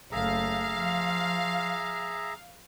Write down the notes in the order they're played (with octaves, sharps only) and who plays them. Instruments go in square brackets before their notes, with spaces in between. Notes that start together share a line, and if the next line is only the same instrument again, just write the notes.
[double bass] F#1 A3 [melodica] G#4 E5 A#5 [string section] F5
[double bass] F3